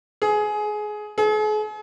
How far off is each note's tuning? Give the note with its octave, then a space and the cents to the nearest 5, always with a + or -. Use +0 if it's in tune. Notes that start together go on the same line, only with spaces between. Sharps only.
G#4 +20
G#4 +45